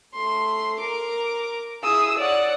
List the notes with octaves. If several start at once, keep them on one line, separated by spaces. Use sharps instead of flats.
A3 C6
A#4 D6
E4 G#4 D#6 E6
C#5 D5 F#5